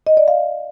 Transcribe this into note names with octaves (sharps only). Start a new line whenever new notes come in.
D#5
D5
F5